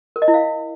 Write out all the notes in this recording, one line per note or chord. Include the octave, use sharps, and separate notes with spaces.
A#4
D#5
E4
F5